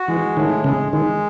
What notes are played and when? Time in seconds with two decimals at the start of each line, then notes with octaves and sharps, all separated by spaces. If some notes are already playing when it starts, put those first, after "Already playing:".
Already playing: F#4
0.08 E3 G#3
0.36 A2 D#3
0.64 C#3 G#3
0.92 D#3 G#3